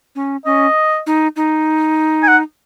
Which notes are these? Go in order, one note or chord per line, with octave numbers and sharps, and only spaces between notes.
C#4
C#4 D#5
D#4
D#4
G#5
F#5